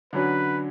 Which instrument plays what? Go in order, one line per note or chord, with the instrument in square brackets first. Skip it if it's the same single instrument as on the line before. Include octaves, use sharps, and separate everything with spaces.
[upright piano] D3 F#3 C#4 [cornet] B4